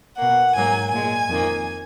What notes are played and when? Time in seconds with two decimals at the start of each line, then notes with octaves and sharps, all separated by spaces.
0.18 B2 A#3 F#5
0.55 G#2 F#3 A#3 G#5
0.92 A#2 G#3 G#5
1.29 F2 D#3 A#3